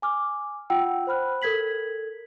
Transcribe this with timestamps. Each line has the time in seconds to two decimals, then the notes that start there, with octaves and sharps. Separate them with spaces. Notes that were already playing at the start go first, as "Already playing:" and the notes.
0.02 G#5 D6 F6
0.70 F4 F#5 G5 E6
1.07 C5 B5 F6 F#6
1.42 A4 A#4 G#6 B6 F#7